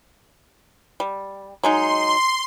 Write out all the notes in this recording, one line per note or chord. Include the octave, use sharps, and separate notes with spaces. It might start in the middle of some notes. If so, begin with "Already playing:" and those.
G3
F#3 G#3 D#4 C6